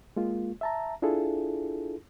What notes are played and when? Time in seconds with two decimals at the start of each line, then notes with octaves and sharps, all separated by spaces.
0.16 G#3 A#3 F4
0.61 E5 A5 A#5
1.02 D4 E4 F4 G#4 A4